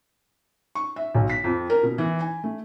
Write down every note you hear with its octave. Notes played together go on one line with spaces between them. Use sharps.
C#6
E5
B1
B6
F2
A#4
B2
E3
G#5
A3